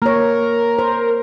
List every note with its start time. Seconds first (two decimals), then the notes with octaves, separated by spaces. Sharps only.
0.02 A#3 A#4 C#5
0.79 C5